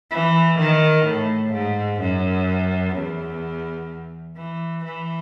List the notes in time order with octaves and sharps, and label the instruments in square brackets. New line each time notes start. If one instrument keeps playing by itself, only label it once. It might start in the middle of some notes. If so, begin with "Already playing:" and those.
[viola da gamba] E3
D#3
A2
G#2
F#2
E2
E3
E3